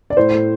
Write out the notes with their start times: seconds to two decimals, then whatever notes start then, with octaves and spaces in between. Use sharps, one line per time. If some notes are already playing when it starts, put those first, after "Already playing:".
0.10 D5
0.17 A2 C5
0.33 A2